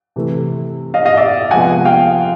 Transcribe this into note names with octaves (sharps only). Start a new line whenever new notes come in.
C3 E3 A3
D#5 F5
D#5 F5
D5 E5
C3 F3 G#3 B3 F#5 G#5
F5 G5